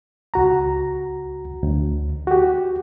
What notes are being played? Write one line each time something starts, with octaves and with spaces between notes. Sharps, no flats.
C#2 F#4 A#5
D2
F#4 G4